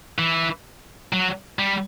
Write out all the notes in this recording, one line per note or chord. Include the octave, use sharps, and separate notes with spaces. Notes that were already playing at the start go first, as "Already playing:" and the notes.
E3
F#3
G3